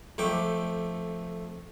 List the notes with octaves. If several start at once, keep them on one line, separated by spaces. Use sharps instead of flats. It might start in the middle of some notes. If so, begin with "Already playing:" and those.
F2 A3 G5 D6